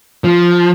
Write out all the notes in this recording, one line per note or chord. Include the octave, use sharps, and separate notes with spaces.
F3